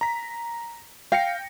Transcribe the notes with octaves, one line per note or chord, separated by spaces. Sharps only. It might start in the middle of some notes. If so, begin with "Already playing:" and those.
A#5 B6
F5 G5 A#6 C#7